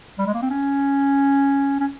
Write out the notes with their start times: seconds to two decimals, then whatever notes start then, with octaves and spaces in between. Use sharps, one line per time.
0.19 G3
0.26 G#3
0.34 A#3
0.42 C4
0.50 C#4
1.80 C#4